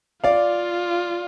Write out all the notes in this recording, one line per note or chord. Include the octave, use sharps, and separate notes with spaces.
F4 D5 F5